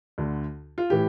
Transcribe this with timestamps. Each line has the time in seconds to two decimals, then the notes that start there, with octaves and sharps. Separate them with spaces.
0.18 D2 D3
0.78 F4
0.90 A2 E3 G4